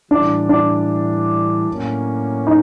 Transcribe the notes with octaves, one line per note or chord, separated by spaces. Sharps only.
A2 E3 G3 D4
D4
A2 F#3 A#3 C#4
D#4